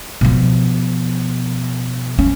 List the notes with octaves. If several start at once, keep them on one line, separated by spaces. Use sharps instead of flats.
B2 F3
C#4